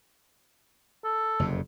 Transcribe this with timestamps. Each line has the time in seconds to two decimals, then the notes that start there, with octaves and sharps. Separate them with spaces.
1.04 A4
1.39 F#1 F2 C3